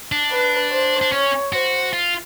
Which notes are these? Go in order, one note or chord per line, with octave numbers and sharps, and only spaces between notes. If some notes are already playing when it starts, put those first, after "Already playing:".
D4
B4
C5
D4
C#4 C#5
F#4 C5
F4